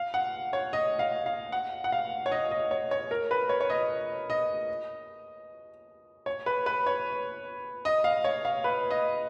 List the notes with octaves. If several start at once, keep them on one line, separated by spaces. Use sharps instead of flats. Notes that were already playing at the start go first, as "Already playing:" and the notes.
Already playing: F5
F#5
C#5
D#5
F5
F5
F#5
F#5
F5
C#5
D#5
D#5
C#5
C#5
A#4
B4
C#5
C#5
D#5
D#5
C#5
B4
B4
C#5
D#5
F5
C#5
F5
B4
D#5